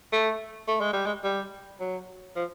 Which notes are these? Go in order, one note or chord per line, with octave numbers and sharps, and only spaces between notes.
A3
A3
G#3
G3
G#3
G3
F#3
F3